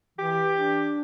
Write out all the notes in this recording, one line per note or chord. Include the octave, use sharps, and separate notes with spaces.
E3 G4
D4